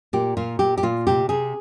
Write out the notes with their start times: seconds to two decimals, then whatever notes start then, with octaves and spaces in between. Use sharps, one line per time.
0.13 A#2 G4
0.37 A#2 F4
0.59 A#2 G4
0.78 G4
0.83 A#2 F4
1.07 C3 G4
1.29 C3 G#4